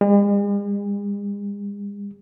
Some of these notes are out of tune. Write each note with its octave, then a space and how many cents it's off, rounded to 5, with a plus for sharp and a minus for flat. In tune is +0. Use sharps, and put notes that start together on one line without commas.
G#3 -45